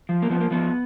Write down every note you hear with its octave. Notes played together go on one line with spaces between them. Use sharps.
F3
A#3
F3 B3
A#3
F3 B3